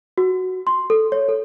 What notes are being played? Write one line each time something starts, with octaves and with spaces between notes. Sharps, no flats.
F#4
C6
A4
C#5
A4